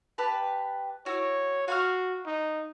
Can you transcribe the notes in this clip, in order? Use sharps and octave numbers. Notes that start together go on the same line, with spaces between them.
G4 B4 A5
E4 F#4 C#5
F#4 F5 C#6 F6
D#4